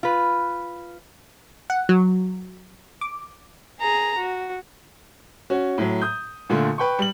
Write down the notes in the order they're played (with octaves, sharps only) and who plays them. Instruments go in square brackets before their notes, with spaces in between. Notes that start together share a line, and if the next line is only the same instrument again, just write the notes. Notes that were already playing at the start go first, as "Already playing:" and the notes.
[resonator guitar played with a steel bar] F4 B4
[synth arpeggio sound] F#5
F#3
D6
[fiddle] G#4 A#5
F#4
[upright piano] C#4 F#4
A2 F#3
D#6 G6
A#2 D3 A3 F4
B4 G5 C#6
G3 F#7